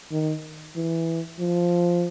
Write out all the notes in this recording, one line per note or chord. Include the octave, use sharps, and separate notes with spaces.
D#3
E3
F3